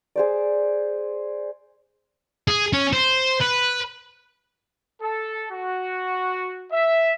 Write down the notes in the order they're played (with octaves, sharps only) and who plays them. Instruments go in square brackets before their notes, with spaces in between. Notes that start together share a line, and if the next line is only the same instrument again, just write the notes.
[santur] G#4 C5 D5
[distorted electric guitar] G#4
C#4
C5
B4
[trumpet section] A4
F#4
E5